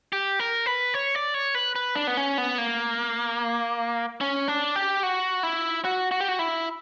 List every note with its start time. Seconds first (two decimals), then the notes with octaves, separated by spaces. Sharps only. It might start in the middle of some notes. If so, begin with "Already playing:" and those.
0.13 G4
0.39 A#4
0.66 B4
0.94 C#5
1.15 D5
1.34 C#5
1.55 B4
1.76 B4
1.96 D4
2.07 B3
2.17 C#4
2.38 B3
2.58 A#3
4.21 C#4
4.48 D4
4.76 G4
5.03 F#4
5.43 E4
5.85 F#4
6.11 F#4
6.20 G4
6.29 F#4
6.39 E4